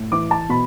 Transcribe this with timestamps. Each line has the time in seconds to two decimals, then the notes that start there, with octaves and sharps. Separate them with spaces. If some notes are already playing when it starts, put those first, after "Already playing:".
Already playing: A2
0.12 E3 D6
0.31 A5
0.49 B2 B5